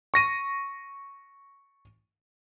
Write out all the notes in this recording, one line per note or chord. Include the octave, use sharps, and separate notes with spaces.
C#6 A#6 D#7